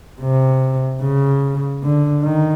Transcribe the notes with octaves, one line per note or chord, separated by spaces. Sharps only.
C3
C#3
D3
D#3